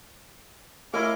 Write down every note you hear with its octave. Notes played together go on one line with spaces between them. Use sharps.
A3 C#4 E4 A#4 D#5 F5 D6